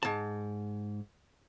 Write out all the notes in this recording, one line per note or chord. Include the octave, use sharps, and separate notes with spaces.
G#2 A5